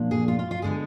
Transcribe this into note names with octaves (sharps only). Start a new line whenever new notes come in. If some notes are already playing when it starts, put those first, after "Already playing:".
Already playing: A#2 F3 A#3 D4
G#4
F4
F4
F4
D3 G#3 B3 G#4